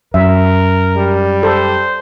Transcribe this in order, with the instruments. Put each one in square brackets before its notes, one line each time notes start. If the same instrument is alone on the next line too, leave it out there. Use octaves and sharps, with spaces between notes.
[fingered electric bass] F#2 [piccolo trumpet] A#4 [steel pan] E5
[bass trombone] G3
[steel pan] A4 A5 [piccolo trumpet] C5